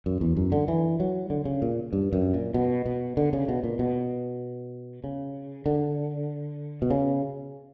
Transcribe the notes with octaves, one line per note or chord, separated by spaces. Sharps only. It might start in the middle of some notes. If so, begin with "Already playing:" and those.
F#2
E2
F#2
D3
E3
F#3
D3
C#3
A#2
G2
F#2
A#2
B2
B2
D3
C#3
B2
A#2
B2
C#3
D3
B2
C#3